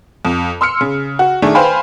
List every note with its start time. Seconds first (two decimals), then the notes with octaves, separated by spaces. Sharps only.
0.25 F2
0.61 C6 E6 F6 C#7
0.81 C#3
1.19 F#4
1.42 D#3 A3 D4 G#4
1.55 B4 C5 F5 G5 G#5 B5